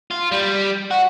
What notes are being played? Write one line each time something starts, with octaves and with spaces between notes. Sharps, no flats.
F4
G3
F#4